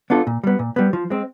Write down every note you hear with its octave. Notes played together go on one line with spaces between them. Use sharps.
B3 D4 F4 A4
A#2
G3 B3
A#2
G3 B3
F3
G#3 C4